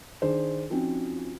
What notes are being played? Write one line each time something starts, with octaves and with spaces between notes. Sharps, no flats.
D#3 D4 G#4 C5
F3 C4 C#4 D#4 F4 F#4